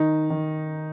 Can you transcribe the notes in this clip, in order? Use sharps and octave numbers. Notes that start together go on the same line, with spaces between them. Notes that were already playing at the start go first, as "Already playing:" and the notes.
Already playing: D#3 D#4
D#3